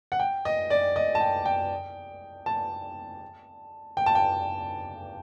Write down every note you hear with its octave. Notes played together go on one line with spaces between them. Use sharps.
F#5
G5
D#5
D5
D#5
A5
G5
G5
A5
G5
A5
G5